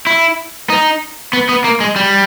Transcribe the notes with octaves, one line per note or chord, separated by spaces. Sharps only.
E4
D#4
B3
B3
A#3
G#3
G3